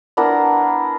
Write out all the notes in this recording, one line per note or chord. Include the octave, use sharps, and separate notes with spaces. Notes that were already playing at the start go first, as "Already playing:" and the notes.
B3 D4 E4 A#4